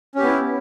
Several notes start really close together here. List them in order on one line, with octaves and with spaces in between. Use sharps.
C#4 G4 B3 E4